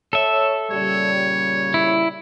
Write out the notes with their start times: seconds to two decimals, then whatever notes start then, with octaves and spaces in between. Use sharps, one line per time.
0.13 A4 C#5 E5
0.71 A#2 C#3 G3 C#5
1.74 E4